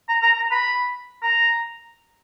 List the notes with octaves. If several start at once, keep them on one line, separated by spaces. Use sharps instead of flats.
A#5
A#5
A#5
B5
A#5